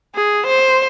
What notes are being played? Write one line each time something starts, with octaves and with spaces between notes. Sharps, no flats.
G#4
C5